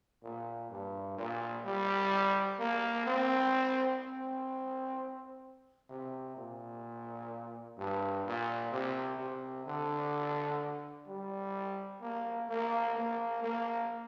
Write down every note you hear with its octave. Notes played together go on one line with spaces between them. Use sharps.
A#2
G2
A#2
G3
A#3
C4
C4
C3
A#2
G2
A#2
C3
C3
D3
G3
A#3
A#3
A#3
A#3